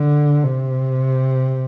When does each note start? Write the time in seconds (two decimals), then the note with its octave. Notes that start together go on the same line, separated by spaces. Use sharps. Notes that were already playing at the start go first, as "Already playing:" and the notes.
Already playing: D3
0.44 C3